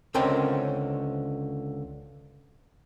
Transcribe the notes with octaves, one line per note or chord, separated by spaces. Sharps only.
C#2 D3 C4 C#4 A#4 G5